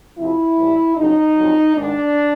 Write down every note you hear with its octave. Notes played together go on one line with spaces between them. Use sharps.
F2 C3 F3 E4
A2 E3 G3
F2 C#3 F#3 D#4
F2 D3 F#3
G#2 D#3 G#3 D4